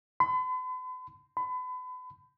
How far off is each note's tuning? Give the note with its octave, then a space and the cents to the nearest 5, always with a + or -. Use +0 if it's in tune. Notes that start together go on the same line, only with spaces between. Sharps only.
B5 +45
B5 +35